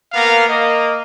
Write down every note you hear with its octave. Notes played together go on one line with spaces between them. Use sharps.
A#3 B3 A#4 F5
A#3 D#5